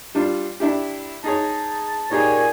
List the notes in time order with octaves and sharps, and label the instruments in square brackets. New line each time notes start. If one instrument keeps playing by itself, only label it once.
[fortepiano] G3 D4 F4
D4 E4 G4
[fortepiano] D#4 G#4 C#5 [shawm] A5
[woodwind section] A#2 G#5 [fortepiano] D#4 G4 G#4 [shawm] C#5